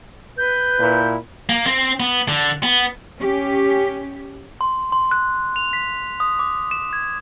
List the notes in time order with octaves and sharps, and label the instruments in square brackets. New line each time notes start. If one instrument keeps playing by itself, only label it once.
[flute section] B4 [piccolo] G6
[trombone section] A#2 E4 A#4
[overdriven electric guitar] A#3
C4
B3
D3
B3
[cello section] C#4 G4
[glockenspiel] C6
C6
F#6
F7
B6
D#6
D6
E7
G#6